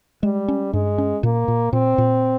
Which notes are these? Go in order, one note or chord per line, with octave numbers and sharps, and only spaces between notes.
G3 G#3
C#4
G2 G#3
C#4
A#2 A#3
A#2
A#2 C4
A#2